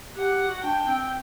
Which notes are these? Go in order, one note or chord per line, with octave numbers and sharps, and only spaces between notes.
G4 F#5
G4
F#4
D4 G5
C4